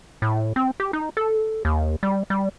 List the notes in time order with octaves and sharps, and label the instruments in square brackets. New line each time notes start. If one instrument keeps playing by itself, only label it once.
[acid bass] A2
C4
G4
D#4
A4
D#2
G3
G3